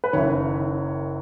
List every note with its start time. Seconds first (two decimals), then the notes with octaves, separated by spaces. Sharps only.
0.04 B4
0.13 F#1 F#2 D#3 C#5